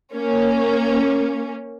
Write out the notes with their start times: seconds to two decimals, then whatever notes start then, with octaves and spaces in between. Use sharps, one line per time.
0.14 A#3 C#4